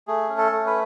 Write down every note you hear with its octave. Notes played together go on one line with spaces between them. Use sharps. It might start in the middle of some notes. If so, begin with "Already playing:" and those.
A3 G#4
C#4
A4
A3
B4